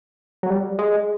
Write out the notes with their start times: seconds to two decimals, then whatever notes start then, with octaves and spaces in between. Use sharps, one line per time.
0.43 F#3
0.50 G3
0.79 G#3